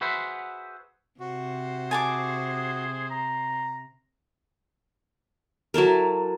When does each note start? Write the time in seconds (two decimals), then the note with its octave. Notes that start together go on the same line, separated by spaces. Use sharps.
0.01 F#4 G#4 B4 C5 E5 F#5
1.20 C3 F#4 C5
1.91 G#4 G#5 A5 D6
3.10 A#5
5.74 F#3 E4 A4 A#4